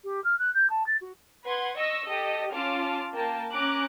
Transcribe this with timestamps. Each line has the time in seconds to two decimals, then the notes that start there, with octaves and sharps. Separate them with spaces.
0.04 G4
0.24 F6
0.39 F#6
0.54 G6
0.70 A5
0.86 A6
1.01 F#4
1.44 B4 F#5 C6 G#6
1.76 D#5 C#6 E6 A#6
2.05 G4 A4 D#5
2.52 C#4 F4 A5 D6 F6
3.12 A#3 A#4 G5 A5
3.51 C#4 A#5 D6 F#6